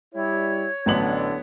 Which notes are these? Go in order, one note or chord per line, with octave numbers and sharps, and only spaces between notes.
G3 E4 C#5
A1 D3 F#3 A3 B3 C#4 F#7